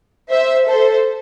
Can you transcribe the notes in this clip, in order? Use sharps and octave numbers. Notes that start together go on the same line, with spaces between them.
C5 E5
A4 C5